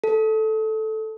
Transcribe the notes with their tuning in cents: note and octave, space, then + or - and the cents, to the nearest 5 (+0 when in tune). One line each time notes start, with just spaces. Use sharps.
A4 -5